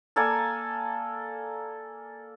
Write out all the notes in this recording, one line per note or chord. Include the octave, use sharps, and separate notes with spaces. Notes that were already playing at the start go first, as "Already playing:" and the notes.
A#3 A4 D5 G#5